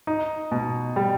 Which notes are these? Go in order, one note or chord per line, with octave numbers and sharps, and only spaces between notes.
D#4
B2
G3